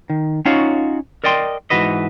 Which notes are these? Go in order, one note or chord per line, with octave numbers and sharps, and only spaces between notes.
D#3
C#4 D#4 F4 F#4 C#5 F5
A#4 D5 D#5 G5 C6
G#2 C#3 E3 F#4 B4 D#5